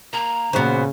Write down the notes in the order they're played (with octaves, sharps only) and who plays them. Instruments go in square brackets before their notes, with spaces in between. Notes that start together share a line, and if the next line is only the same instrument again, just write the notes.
[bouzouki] A#3 [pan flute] A#5
[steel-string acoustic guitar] E2 A#2 [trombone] C#3 [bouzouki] B3 F#4 C5